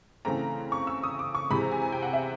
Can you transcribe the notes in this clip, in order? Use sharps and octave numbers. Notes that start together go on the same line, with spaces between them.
C#3 E3 A3 C4 A#5
C#6
E6
D#6
D6
C#6
C3 E3 G#3 C4 B5
A#5
G#5
G#5
G5
F#5
E5